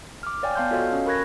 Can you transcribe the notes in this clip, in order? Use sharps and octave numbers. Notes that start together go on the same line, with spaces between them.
D6 F6
C#5 D5 F5 G5 G#5
B3 F5 A5 C6 F6 G6
F4 F#4 A4 C#5 D#5 F5
C#4
A#4 B5 C#6 F#6 G#6 A#6